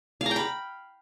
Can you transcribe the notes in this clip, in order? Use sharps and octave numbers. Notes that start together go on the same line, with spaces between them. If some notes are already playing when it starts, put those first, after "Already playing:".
F5
A#5
G5
B5